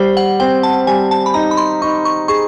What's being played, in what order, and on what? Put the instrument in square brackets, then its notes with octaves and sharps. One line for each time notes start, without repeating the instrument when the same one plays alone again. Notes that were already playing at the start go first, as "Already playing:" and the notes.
Already playing: [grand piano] G3 [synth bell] C5
[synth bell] F#5
[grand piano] C4 [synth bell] G5
[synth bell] A5
[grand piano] G3 [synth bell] G#5
[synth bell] A5
B5
[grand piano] D#4 [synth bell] A#5
[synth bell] B5
C6
[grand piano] D#4 [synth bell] C#6
[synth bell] C#6
[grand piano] G#4 [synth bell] C#6